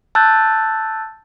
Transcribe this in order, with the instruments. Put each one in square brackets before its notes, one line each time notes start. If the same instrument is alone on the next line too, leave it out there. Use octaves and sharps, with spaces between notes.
[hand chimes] A5 E6 F#6 G6 A6